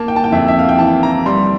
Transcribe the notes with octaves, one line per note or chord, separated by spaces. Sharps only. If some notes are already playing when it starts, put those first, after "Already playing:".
Already playing: A#3 A5
G5
A5
G5
F2 E5
E5
F5
G5
E3 A5
A#5
G3 C6